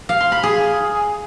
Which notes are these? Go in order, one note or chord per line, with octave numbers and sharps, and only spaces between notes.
F5
C6
B5
G#4